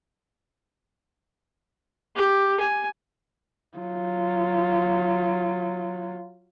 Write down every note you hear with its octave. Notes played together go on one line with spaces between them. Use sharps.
G4
G#5
F#3 F4